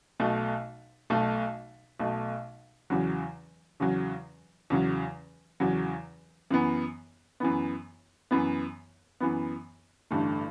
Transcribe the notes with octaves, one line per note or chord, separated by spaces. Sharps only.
B1 B2 A3
B1 B2 A3
B1 B2 A3
E2 C#3 F#3
E2 C#3 F#3
E2 C#3 F#3
E2 C#3 F#3
F#2 E3 B3
F#2 E3 B3
F#2 E3 B3
F#2 E3 B3
A1 G2 D3 A3